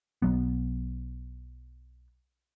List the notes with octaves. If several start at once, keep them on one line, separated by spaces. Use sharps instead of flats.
B1 F#3 B3